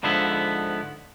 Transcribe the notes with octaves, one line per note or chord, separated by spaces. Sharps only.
G#2 D3 F3 B3 E4